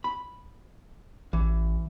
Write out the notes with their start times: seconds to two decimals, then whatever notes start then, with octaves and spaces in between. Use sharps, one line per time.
0.04 B5
1.33 A1 E3